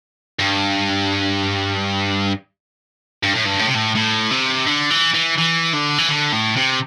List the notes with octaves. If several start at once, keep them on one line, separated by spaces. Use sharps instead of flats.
G2
G2
A2
G2
A2
C3
A2
A2
C3
D3
E3
E3
E3
D3
E3
D3
A2
C3